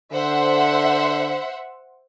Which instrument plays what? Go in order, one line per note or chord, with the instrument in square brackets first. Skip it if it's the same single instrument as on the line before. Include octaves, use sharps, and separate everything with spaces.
[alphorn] D3 [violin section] C5 E5 F#5